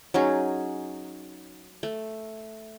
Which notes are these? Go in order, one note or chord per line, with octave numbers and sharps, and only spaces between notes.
F#3 C#4 D#4 G#4
A3